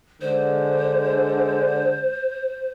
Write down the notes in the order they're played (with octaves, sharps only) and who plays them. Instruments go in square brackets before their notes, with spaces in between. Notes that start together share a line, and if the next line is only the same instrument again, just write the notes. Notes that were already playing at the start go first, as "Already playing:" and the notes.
[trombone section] D3 G#3 [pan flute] C5